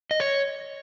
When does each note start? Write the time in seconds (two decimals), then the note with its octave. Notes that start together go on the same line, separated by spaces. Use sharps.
0.11 D#5
0.20 C#5